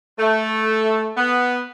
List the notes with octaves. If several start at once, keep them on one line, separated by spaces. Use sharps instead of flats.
A3
B3